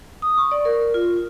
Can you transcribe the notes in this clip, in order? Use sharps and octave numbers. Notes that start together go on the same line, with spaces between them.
D#6
C#6
D5
A#4
F4